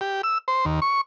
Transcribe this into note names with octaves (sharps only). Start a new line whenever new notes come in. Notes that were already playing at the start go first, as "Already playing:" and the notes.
G4
E6
C5
D#2
C#6